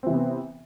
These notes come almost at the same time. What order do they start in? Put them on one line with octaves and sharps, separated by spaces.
C4 E3 C3 B3